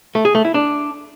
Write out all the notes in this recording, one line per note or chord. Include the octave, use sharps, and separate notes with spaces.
A3
G#4
A3
E4
D4